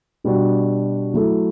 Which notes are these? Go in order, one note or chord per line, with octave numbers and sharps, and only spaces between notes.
B2 G3 D4 F#4
F#3 A3 E4 A4